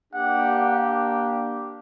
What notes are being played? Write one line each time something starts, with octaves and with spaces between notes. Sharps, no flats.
A#3 D4 G4 F#5